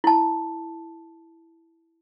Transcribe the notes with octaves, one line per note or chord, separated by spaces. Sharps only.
E4 A5